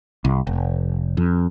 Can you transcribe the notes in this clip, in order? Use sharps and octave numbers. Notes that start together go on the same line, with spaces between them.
C2
F1
F2